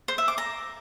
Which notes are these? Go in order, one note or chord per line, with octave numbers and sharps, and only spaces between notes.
C5
E5
D6
A#5